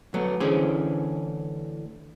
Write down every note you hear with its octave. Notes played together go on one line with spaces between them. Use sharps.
F#3 A3 B3
D2 D3 E3 C#4 G#4 C5